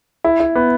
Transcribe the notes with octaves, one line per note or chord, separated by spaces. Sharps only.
E4
E4
B3